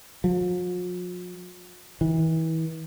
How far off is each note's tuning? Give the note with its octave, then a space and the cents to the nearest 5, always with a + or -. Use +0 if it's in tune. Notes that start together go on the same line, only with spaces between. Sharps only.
F3 +45
E3 -35